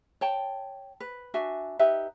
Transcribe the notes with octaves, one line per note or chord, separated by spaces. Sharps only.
C#5 G5 A5
B4
D4 F#4 E5 G#5
D#4 G4 B4 E5